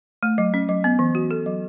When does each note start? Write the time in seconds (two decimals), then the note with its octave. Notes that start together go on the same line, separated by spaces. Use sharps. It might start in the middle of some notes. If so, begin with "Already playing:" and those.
0.23 A3
0.38 F#3
0.54 C#4
0.69 F#3
0.84 B3
0.99 E3
1.15 F#4
1.31 A4
1.46 F#3